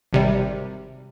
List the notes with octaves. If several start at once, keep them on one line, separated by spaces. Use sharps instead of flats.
G#1 C3 G3